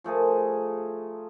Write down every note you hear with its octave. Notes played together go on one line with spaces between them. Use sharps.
F3 A3 G#4 A#4